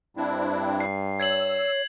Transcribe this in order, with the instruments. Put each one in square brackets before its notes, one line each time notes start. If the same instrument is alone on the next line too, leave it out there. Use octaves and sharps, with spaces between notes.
[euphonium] G2 [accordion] C4 D4 E4
[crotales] C7
[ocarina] C#5 [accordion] E6 [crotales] G#6 C7 F#7